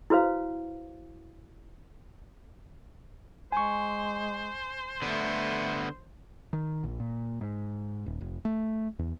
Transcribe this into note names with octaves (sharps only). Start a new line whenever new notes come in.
E4 F#4 B4 C5 F5
G#3 C5 G#5 C#6
D3 A3 B3
D#3
A#1
A#2
G#2
D#1
F1
A3
E2